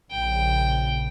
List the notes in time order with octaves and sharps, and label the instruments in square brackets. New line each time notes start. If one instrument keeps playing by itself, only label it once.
[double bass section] A#1 C#3 [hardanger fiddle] G5